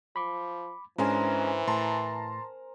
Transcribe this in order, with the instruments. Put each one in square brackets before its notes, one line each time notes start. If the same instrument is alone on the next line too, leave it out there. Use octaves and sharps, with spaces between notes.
[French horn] F3 [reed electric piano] B5 D6
[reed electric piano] G#2 [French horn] E3 [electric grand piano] G#3 C#4 D4 [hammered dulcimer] A#4 C5 G#5
[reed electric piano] A2 [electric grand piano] A5 A#5 C6